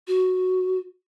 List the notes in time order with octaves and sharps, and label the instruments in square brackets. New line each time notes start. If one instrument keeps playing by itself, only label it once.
[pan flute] F#4